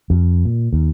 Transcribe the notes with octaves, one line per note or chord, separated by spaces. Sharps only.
F2
A#2
D#2